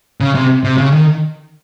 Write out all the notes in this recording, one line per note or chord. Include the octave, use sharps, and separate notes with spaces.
C#3
C3
C3
C#3
D#3